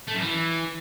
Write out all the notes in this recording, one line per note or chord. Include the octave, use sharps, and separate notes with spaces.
A3
F#2
E3